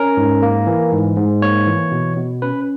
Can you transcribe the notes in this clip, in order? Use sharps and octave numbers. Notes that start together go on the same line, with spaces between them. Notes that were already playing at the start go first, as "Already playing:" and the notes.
Already playing: C#4 A#4
G#2
A#3
E3
G#2
G#2
A#3 C#5
E3
B2
B2
C#4 B4